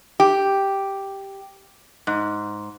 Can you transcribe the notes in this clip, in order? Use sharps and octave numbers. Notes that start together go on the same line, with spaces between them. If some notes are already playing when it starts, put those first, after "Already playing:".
G4
G#2